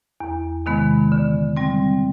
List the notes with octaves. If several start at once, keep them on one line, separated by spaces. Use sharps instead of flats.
E2
C3 D#3 G#3 B3
D3
G3 C4